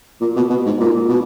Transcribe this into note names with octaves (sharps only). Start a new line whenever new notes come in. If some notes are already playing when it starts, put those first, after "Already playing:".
A#2
B2
B2
G#2
A#2
B2